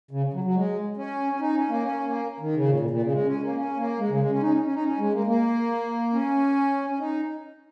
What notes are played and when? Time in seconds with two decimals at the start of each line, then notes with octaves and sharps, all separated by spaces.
0.11 C#3
0.33 F#3
0.44 F#3
0.55 G#3
0.97 C#4
1.33 C#4
1.40 D#4
1.55 C#4
1.69 A#3
1.83 C#4
2.05 A#3
2.40 D#3
2.55 C#3
2.69 A#2
2.80 A#2
2.90 A#2
3.02 C#3
3.12 G#3
3.26 C#4
3.41 A#3
3.55 C#4
3.77 A#3
3.99 G#3
4.09 C#3
4.20 G#3
4.30 C#4
4.41 D#4
4.52 C#4
4.63 C#4
4.74 D#4
4.84 C#4
4.98 G#3
5.13 A#3
5.27 A#3
6.13 C#4
6.90 C#4
6.99 D#4